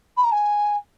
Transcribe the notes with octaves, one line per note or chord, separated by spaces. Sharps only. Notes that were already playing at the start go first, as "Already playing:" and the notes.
B5
A#5
G#5